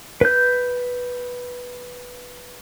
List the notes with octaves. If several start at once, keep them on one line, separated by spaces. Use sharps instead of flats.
B4 G6